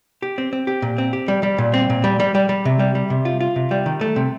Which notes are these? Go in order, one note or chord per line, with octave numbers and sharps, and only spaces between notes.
G4
C4
C4
G4
A#2
C4
G4
G3
G3
A#2
C4
A#2
G3
G3
G3
G3
C3
G3
G3
C3
F4
F4
C3
G3
D#3
A3
C3